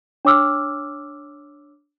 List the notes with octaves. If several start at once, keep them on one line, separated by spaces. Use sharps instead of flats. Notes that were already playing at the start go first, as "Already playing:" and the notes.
D4 C#5 D6 E6 F6